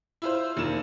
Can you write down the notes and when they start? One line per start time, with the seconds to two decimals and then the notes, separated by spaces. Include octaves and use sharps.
0.22 E4 F4 C5
0.57 F1 D#3 A#3 E7